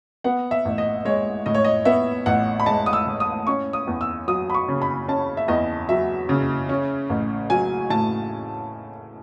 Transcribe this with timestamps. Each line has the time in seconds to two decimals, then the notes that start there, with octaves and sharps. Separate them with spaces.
0.24 B3 F#5
0.51 E5
0.65 A1
0.78 D#5
1.05 G#3 C#5
1.46 A2 D#5
1.54 C#5
1.64 D#5
1.85 B3 E5
2.26 A1 F#5
2.60 B5
2.66 G#3 A5
2.86 D#6
2.93 E6
3.06 A2
3.20 D#6
3.47 C#4 C#6
3.73 D#6
3.87 E2
4.01 E6
4.28 F#3 D#6
4.50 B5
4.54 C#6
4.69 C#3
4.82 B5
5.08 C#4 A5
5.37 E5
5.48 E2 D#5
5.89 F#3 E5
6.29 C#3
6.69 C#4
7.10 A1
7.50 F#3 G#5
7.90 A2 A5